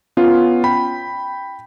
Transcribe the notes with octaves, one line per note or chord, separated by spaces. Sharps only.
B3 C#4 F4
G5 B5